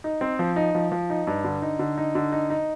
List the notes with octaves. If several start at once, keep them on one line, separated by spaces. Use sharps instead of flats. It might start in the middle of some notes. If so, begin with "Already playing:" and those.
D#4
C4
F3
D#4
F3
F3
D#4
G2
D3
D#4
D3
D#4
D3
D#4
D#4